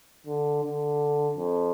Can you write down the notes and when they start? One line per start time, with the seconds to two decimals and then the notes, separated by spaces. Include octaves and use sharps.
0.26 D3
0.63 D3
1.37 F2